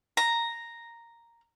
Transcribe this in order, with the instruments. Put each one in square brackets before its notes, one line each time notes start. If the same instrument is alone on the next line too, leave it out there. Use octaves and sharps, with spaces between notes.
[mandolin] A#5